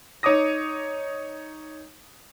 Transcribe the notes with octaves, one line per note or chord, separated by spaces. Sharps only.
D#4 C#5 D6 D#6 A#6